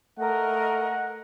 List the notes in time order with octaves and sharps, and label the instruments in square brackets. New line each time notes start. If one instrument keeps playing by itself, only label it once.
[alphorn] A3 [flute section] A#4 D#5 [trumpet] F#5